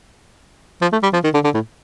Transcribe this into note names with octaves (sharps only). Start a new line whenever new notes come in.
F3
A3
G3
F3
D#3
D3
D3
A2